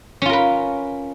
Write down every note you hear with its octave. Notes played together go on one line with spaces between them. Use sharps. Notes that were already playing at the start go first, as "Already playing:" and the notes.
C#4 F4 A#4 B4